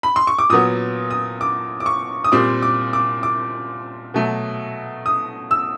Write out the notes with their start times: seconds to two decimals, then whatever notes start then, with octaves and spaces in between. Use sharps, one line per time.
0.03 B5
0.16 C6
0.27 C#6
0.39 D6
0.49 A#2 F#3 B3 D#6
1.10 D#6
1.41 D6
1.80 D6
1.86 C#6
2.24 D#6
2.32 A#2 G3 C4 D6
2.62 D6
2.93 D6
3.23 D6
4.14 B2 F#3 A3
5.06 D#6
5.51 E6